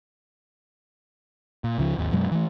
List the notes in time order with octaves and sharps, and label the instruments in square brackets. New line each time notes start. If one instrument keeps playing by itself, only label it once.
[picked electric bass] A#2
C#2 C#3 F3
G#1 D#2
F#2 B2 F#3 G#3
E3 A3